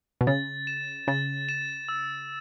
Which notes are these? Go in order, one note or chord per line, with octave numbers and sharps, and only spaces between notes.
B2
C#3 A6
E7
C#3 A6
E7
E6